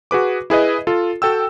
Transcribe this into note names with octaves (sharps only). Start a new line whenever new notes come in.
F#4 G#4 B4 D6
E4 G#4 B4 D#5
F4 A4
F#4 A4 G5 E6